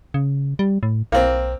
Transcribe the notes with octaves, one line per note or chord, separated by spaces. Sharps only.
C#3
G3
A2
B1 A#3 C4